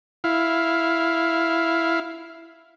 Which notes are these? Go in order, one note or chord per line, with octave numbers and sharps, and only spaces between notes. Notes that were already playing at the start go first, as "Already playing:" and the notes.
E4 F5